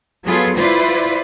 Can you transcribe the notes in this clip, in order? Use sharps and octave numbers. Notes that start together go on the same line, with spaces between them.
F#3 B3 F4 G#4 A4
E4 F4 B4 C5 D5